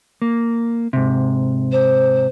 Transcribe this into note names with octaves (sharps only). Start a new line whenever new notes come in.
A#3
G#2 C3
C5